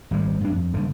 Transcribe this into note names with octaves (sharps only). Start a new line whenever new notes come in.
G#1 G3 G#3
G2 D4
F2
F#1 G2 D3 D#3